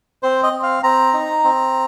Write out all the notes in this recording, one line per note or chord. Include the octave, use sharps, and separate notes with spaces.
C4 C5
D#5
C4
F5
C4 A#5
D#4
C4